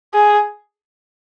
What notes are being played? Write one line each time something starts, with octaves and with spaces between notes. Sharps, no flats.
G#4